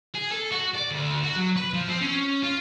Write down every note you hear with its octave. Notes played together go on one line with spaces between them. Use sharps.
G#4
A4
F#4
D5
D2
F#4
F#3
B4
F3
C4
C#4
F4